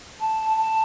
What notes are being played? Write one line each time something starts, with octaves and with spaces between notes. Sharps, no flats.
A5
A5